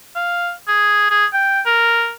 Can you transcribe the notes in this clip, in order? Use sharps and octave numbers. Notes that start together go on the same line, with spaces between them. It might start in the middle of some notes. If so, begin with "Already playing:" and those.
F5
G#4
G#4
G5
A#4